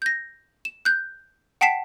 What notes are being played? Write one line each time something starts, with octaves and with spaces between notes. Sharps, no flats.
G6 A#6
E7
F#6 G6
F#5 G5 A5 B6 C7 E7